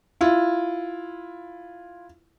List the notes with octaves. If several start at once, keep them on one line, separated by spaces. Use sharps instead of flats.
E4 F4